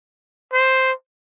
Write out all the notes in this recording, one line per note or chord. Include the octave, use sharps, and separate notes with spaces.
C5